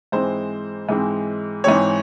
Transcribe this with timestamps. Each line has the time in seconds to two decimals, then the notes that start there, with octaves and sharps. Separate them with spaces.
0.12 G#2 E3 G#3 C4 C5
0.89 G#2 E3 G#3 C4
1.64 G#2 E3 G#3 C4 C#5